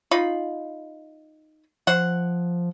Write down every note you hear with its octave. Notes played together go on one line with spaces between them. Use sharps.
D#4 F4 B5
F3 C5 F#5